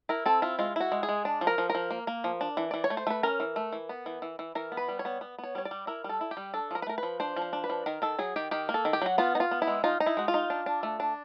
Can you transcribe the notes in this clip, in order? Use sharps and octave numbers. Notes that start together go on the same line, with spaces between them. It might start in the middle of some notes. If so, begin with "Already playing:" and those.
E4 A#4
C4 A4
E4 F4
G#3 F4
E4 F#4
G#3
G#4
G#3
D4
F3
A#4
F3
A#4
F3
A#3
A#3
F3
D4
E3
E3 D5
C#5
A3
C5
A3 B4
C#4 A#4
E3
A3
E3
B3
E3
E3
E3
E3 A#4
B3
B4
G3
C#5
B3
B3
B3
C#5
G3 C#5
D5
G3
E4 A#4
G3 A4
E4
G4
G3
D4 A4
F3 A#4
B4
A3 A#4
B4
F3
D4 C5
F3
C5
D4
B4
F3
D#3 A#4
D#3 A4
F#3 G#4
D#3 G4
D#3 G4
A#3
A4
D#3
G4
F#3 F#4
B3 F4
D#4
F4
B3
E4
G#3
D#4 F4
D#4
E4
G#3 F#4
F4
D#4
D4
D4
A3
D4